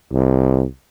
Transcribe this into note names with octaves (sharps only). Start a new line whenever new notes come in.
C2